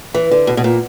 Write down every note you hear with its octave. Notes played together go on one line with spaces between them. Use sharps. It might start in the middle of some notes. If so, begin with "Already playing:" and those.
E3
D3
B2
B2
A#2